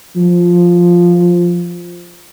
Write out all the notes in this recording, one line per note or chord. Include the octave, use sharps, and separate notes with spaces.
F3